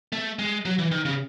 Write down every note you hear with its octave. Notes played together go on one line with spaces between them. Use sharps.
A3
G#3
F#3
E3
D#3
C#3